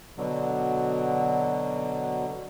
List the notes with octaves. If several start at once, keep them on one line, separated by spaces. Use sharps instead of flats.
B2 D3 F#3